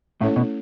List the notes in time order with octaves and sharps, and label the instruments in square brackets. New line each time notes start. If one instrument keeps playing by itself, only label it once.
[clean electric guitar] A2 [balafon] A3 C#4 E4 A4 C#5
[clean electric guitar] B2